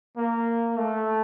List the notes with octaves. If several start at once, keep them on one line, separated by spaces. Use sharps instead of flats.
A#3
A3